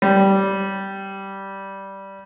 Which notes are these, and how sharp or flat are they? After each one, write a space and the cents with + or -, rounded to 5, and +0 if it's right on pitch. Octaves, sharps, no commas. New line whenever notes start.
G3 -10